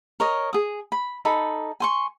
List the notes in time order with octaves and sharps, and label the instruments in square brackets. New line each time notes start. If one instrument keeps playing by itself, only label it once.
[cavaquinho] A#4 C#5 D#5
G#4 D#6
B5
D#4 A4 B5
G#5 C6 C#6